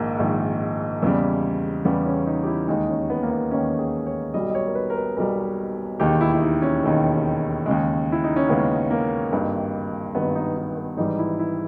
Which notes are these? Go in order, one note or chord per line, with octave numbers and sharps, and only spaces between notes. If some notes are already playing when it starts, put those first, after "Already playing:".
Already playing: A#1 G#2 D#3 A#3
A#1 G#2 D#3
E2 C#3 G3
E2 C#3 G3 B3
C#4
D#4
G4
E4
D#2 D#3 G#3 D#4
C#4
B3
A#3
B3
D#2 D#3 G#3 C#4
G#4
C#5
B1 B2 G3 D#5
D#5
C#5
A#4
B4
A#4
B4
B1 B2 G3 A#4
E1 D#2 D#3 G4
E4
E4
D#4
C#4
E1 D#2 D#3
D#2 C#3 G#3
E4
D#4
C#4
D#2 C#3 G#3 B3
A#3
G#1 G2 D#3
G#1 G2 D#3 B3
D#4
D#4
B3
G#1 G#2 E3 G3 D#4
E4
E4